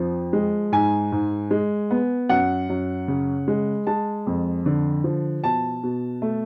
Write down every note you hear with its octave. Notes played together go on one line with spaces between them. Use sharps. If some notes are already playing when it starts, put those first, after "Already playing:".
Already playing: F2 F3
G#3
G#2 G#5
G#2
G#3
B3
F#2 F#5
F#2
C#3
G#3
G#3 A5
F2
D3
F3
B2 A5
B2
A3